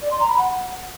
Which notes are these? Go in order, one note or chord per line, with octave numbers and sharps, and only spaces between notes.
D5
C6
A#5
B5
F#5